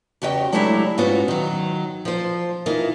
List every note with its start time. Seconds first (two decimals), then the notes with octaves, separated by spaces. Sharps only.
0.22 E2 C#3 F#4 G4 D#5 G5
0.53 F#3 G#3 A3 D4 E4 G4
0.98 G#2 B3 C#4 F4 F#4
1.28 D#3 F#3
2.05 F3 C5
2.66 E3 D#4 F4 A#4